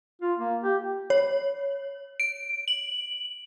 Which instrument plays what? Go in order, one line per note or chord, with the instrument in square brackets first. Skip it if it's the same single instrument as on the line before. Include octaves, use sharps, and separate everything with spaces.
[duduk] F4
A#3
G4
[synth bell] C#5
D7
F#7